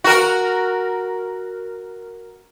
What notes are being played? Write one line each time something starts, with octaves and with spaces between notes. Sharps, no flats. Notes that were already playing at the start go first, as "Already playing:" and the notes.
F#4 A#4